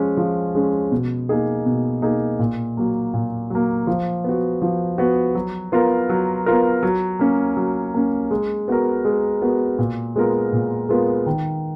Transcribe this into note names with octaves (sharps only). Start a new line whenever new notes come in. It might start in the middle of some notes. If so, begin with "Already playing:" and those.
Already playing: F3 G#3 C#4
F3
G#3 C#4
B2
A#3 D#4 G#4
B2
A#3 D#4 G#4
A#2
F#3 A#3
A#2
F#3 A#3
F3
B3 F#4
F3
B3 F#4
F#3
B3 F4 A#4
F#3
B3 F4 A#4
F#3
A#3 C#4
F#3
A#3 C#4
G#3
B3 F#4 A#4
G#3
B3 F#4 A#4
A#2
G#3 B3 F4 A#4
A#2
G#3 B3 F4 A#4
D#3